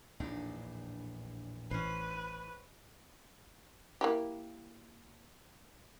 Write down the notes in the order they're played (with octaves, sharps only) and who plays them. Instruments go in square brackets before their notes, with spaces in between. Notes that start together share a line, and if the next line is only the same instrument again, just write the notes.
[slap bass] A#1 E2 A2 [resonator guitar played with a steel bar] D4 D#4
[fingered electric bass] A1 [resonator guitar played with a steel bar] C#4 C5 [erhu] B4
[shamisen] A#3 E4 G4